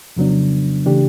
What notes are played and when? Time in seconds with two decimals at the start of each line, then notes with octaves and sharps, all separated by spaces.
0.16 F2 C#3 F#3 B3 D4
0.86 C#3 E3 A3 D4 G4